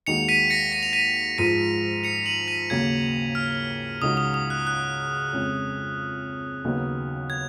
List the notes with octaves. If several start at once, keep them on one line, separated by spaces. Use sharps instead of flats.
D#2 D#3 G#3 D#4 F#4 C#7 F7
B6 D#7
A#6 C#7
D#7
F7
B6 D#7
G#2 F3 G#3 B6 D#7
C#7 F7
D#7 F#7
B6 D#7
D#2 C#3 F#3 A#3 G#6
F6
C#2 C#3 G#3 D#4 F#4 D#6
D#6
D#6
F#6
F#6
F2 C#3 G#3 C#4
D#2 C#3 F#3 B3 D#4
G#6